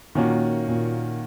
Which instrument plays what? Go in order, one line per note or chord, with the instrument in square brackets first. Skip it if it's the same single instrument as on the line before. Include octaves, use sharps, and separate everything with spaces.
[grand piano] A#2 [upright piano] D#3 A#3 C#4 F#4
[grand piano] A#2